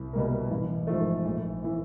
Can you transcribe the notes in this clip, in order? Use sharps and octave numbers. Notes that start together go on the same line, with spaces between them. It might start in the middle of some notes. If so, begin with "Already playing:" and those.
Already playing: C2
B2 G3 A#3
A1
G#2 F3 A3
A#1
E3